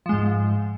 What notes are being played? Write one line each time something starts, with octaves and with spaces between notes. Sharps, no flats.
G#2 F3 G#3